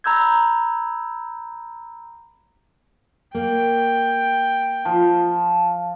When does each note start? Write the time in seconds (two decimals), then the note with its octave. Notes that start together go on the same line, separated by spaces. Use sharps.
0.04 A#5 B5 E6 G6 G#6
3.35 A#3 G5
4.85 F3